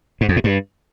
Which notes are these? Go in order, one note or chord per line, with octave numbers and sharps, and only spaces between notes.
G#2
F2
A2
G2